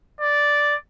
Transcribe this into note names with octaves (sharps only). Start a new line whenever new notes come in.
D5